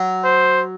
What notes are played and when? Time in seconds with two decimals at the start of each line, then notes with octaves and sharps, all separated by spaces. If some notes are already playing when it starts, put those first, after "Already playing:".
Already playing: F#3
0.24 C5